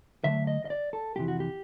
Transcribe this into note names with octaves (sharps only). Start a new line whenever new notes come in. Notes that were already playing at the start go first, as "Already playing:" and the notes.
D3 F#3 A3 E5
D#5
D#5
D5
A4
F2 C3 E3 G4
F#4
G4